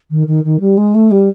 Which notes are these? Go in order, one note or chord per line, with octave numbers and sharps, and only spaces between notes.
D#3
D#3
D#3
G3
G#3
A3
G3